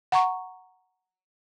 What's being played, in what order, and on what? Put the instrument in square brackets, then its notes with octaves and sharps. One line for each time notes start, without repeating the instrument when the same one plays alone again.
[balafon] F#5 A#5 C#6